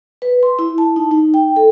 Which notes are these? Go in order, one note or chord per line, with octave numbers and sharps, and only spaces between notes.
B4
C6
E4
A5
D#4
D#4
G5
A4